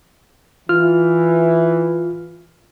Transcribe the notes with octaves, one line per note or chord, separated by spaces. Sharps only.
E3 F4 F6